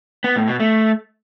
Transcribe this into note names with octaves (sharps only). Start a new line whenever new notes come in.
B3
A2
B2
A3